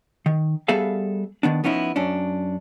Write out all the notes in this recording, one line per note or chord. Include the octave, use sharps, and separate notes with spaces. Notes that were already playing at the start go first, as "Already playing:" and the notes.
D#3
G3 B3 G#4 A4 E5 F5
D#3 B3 D4
F3 B3 C#4 D#4 E4
F#2 C#4 D4